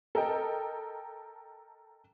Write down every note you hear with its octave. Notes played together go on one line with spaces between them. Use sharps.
A4 A#4 D#5 G5